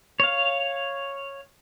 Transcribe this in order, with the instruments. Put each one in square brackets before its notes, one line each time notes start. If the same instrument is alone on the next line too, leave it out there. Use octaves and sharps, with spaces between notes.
[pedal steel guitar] C#5 F5